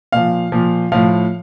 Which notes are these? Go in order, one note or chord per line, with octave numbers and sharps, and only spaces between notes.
A#2 F3 F5
A#2 F3
A2 F3 F5